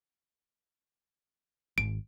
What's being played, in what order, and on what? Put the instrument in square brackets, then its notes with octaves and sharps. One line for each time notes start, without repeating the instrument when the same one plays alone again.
[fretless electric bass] G#1 [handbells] D7